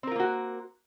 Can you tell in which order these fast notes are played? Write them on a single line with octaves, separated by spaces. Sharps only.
C4 A#4 F4 A#3 F#4